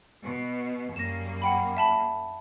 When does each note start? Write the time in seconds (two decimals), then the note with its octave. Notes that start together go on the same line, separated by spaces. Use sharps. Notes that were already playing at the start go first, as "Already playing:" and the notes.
0.25 B2
0.96 F#2 G3 A#3 A#6 E7
1.42 F#5 G5 B5
1.77 E5 A5 B5